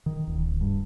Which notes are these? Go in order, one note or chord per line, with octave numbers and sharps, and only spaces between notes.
D#3
D1
G2